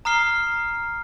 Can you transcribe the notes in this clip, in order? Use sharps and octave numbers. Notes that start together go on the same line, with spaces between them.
A#5 D#6 F6 C7 G7